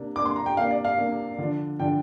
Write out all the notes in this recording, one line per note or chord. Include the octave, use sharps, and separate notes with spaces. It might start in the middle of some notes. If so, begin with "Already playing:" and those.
Already playing: C3 A#3 D4
C3 A#3 D4 D6
C6
A#5
G5
C3 A#3 D4 F5
D5
F5
C3 A#3 D4
D3 F3 D4
D3 F3 D4 G5